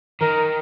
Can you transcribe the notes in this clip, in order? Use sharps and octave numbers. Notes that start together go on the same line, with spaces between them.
D#3 A#4